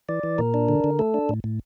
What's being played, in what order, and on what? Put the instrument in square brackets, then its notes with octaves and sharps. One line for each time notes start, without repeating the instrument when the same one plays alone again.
[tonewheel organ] E3 D5
E3
A#2 A#4
D4
D3
D3
A3 A4
D4
A2
A2